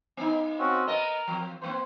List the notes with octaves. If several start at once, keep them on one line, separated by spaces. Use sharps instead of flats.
B3 D#4
C4 C#4 F#4
B3 A#4 D#5
F3 C4
F#2 A#3 C4 C5